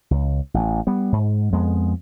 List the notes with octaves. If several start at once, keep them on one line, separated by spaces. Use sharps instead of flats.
C#2
A1
G3 B3
G#2
F2 G#3 B3